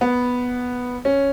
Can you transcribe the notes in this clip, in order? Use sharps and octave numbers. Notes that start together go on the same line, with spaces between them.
B3
C#4